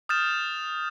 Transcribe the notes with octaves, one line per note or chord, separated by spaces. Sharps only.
D#6 F6 G6 A6 E7